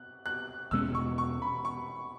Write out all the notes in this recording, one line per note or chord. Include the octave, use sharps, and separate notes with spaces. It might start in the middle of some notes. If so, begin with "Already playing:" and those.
Already playing: F#6
F#6
E2 B2 G#3 C#4 E6
C#6
C#6
B5
C#6